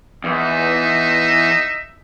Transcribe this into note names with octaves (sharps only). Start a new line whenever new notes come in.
E2 D#4 E5